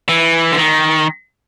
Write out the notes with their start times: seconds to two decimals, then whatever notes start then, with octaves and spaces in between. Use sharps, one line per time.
0.09 E3
0.52 D3
0.58 D#3